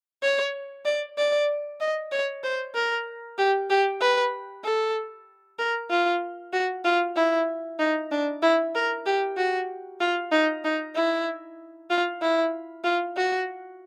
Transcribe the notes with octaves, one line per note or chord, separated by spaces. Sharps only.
C#5
D5
D5
D#5
C#5
C5
A#4
G4
G4
B4
A4
A#4
F4
F#4
F4
E4
D#4
D4
E4
A#4
G4
F#4
F4
D#4
D#4
E4
F4
E4
F4
F#4